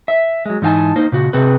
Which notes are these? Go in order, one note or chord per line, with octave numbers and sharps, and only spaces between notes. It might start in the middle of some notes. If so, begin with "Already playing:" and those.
E5
F#3 G#3
G#2 E3 D#4 F5 G#5 A5
A#3 D#4 C5
A#2 C#3 F#4
C3 C4 G#4 B4